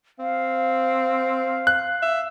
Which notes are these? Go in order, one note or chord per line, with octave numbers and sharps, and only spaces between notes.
C4 F5
F#6
E5